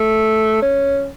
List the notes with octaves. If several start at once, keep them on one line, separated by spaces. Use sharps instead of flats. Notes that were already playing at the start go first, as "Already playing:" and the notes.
Already playing: A3
C#4